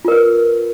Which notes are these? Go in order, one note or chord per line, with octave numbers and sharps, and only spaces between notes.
F4 A#4 B4